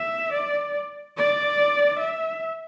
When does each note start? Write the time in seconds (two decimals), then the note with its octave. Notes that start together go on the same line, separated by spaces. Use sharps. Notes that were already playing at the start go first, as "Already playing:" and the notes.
Already playing: E5
0.33 D5
1.17 D5
2.00 E5